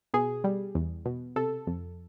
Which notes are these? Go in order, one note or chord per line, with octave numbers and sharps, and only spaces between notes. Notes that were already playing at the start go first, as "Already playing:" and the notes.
B2 G#4
G3
E2
B2
C3 A4
F2